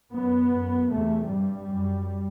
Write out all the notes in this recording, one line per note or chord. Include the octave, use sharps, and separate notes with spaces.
F#2 B3
F#2
E2 C3 A3
G2 G3
F#2